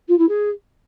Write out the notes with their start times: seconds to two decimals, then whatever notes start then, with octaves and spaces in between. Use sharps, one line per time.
0.08 F4
0.18 E4
0.28 G#4